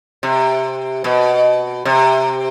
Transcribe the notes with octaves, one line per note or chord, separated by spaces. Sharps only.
C3
B2
C3